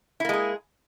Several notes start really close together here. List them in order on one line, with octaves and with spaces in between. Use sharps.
E4 A#3 G#3 G#4